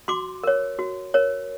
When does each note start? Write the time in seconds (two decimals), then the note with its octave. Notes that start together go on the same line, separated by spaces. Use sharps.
0.08 F#4 C6 D6
0.44 A#4 C#5
0.79 F#4
1.14 A#4 C#5